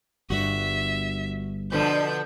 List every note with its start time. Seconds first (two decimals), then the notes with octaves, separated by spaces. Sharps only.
0.30 G1 G2 F#4 E5
1.72 B2 D3 F3 G6